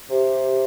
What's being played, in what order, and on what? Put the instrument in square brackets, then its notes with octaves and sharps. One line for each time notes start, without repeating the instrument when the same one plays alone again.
[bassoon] C3 [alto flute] G4